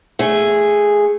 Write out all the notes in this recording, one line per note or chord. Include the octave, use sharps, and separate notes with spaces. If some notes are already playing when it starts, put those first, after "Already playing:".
A3 G#4